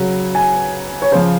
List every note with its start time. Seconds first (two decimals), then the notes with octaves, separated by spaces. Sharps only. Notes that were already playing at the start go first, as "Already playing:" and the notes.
Already playing: C#3 F#3
0.35 G#5
1.02 C#5
1.11 C#3 F3 C5